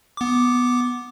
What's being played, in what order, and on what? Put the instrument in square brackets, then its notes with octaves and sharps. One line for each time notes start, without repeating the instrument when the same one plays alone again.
[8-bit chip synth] B3 D6